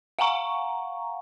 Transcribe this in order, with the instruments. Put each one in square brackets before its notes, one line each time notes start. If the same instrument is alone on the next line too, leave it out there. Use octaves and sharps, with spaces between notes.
[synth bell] F5 F#5 G#5 A#5 C#6